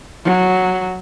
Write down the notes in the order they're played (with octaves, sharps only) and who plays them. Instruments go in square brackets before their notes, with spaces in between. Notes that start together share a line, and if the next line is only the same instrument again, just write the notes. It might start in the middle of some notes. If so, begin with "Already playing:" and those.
[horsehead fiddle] F#3